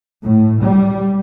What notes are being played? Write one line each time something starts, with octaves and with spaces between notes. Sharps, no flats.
A2
G3